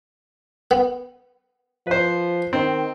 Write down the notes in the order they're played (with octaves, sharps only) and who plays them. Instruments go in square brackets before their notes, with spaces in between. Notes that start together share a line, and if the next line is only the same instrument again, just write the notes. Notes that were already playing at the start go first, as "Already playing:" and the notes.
[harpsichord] B3
[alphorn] F3 [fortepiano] B4 C5
[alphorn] D#3 [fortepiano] C4